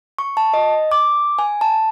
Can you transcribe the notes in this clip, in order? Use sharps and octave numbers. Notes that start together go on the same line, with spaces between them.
C#6
A5
D#5
D6
G#5
A5